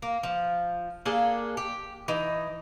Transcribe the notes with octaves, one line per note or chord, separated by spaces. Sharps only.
A#3
F3
A#3 D4 G#4 A4
G4
E3 D#4